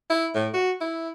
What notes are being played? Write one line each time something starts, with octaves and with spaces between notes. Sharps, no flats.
E4
A2
F#4
E4